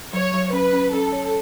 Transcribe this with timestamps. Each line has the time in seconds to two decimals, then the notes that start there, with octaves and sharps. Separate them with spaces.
0.13 F#3 C#5
0.34 F#3
0.53 C#4 B4
0.73 C#4
0.93 C#4 A4
1.12 C#5